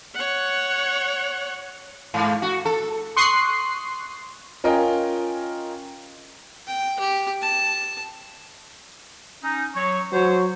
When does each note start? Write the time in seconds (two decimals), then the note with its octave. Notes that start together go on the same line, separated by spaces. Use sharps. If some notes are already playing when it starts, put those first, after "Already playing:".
0.14 C#5 F#5
2.14 G#2
2.42 F#4
2.65 A4
3.17 C6 C#6 D#6 F#6 C7
4.64 C#4 F4 A#4 D#5 G5 G#5
6.67 G5
7.00 G4
7.42 A5
9.44 C#4 D#4
9.75 F#3 C#5
10.13 F#3 C5 C#5